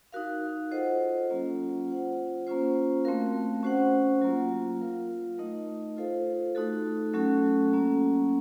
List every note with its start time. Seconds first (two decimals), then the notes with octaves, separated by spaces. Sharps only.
0.12 D#4 F#4 A#4 F5
0.71 F4 A4 C5 D#5 F#5
1.29 F#3 A#3 C#4 F4
1.88 F4 C5 F#5
2.47 A#3 C#4 F4 C5
3.05 A3 C4 F#4 A#4 F5
3.63 C#4 F#4 C5 F#5
4.22 F#3 A#3 F4
4.80 F4 A#4 F5
5.38 A3 D#4 A#4 D#5
5.97 F4 A4 C5 F5
6.55 A3 D#4 F#4 A4
7.14 F#3 A3 C#4 F#4 A4
7.72 F#3 A#3 C#4